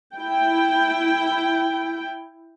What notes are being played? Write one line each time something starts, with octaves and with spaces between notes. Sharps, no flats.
E4 G5